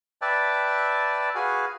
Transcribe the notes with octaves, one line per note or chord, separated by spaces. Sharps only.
B4 D5 E5 G5 A5
F#4 G#4 B4 F5 G#5